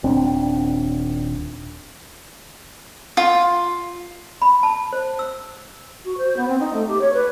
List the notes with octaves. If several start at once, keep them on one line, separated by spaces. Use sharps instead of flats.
D#1 C4 D4
F4
B5
A5
C5
E6
F#4
C5
B3
C4
D#4
A3
G4
C#5
B4